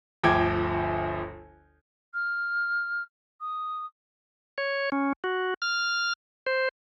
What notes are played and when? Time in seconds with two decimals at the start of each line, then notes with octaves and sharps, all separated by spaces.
0.23 G1 D2 F3 G5 D6 G#6
2.14 F6
3.40 D#6
4.58 C#5
4.92 C#4
5.24 F#4
5.62 F6
6.47 C5